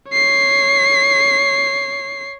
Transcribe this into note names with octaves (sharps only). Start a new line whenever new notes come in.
C#5 C7